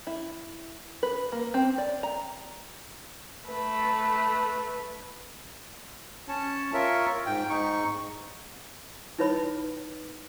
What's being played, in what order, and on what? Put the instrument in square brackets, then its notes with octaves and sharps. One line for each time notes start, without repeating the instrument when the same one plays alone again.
[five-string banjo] E4
B4
A#3
C4
D5
A#5
[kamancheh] A3 B4
[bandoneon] C#4 C#5 A5
F4 A#4 C#5 E5
G#2 G5
G#2 D#4 C#6
[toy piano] D#4 E4 B4 C#5 B5